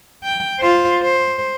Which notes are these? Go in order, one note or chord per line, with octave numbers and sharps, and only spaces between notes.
G5
F4 C5
C5